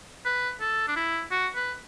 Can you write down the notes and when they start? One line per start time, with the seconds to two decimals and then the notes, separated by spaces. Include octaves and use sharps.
0.25 B4
0.61 A4
0.88 D4
0.96 E4
1.31 F#4
1.55 B4